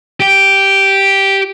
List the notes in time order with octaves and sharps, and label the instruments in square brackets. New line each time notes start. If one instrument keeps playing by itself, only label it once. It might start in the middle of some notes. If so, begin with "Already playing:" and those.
[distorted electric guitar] G4